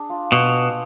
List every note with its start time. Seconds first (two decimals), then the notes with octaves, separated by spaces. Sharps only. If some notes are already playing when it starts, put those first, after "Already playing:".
Already playing: D4 G#4
0.10 F4
0.32 B2